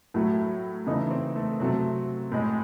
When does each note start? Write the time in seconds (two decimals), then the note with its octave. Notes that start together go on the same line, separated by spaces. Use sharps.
0.14 A2 F#3 A3
0.87 C#3 E3 A3 D#4
1.11 C4
1.36 A3
1.60 C3 F#3 A3 C4
2.32 A2 G#3